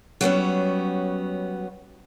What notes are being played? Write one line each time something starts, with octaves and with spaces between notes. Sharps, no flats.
F#3 G3 B3 C#4